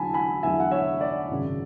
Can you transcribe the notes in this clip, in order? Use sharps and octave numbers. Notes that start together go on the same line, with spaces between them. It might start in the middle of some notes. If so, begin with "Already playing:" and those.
Already playing: E2 D3 F#3 G#5 A5 B5
G#5 B5
E2 D3 F#3 E5 G#5
F#5
C#5 E5
D5
G#1 F#2 C#3